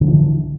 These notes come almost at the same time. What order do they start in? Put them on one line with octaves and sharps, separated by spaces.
D3 G3 F3 E3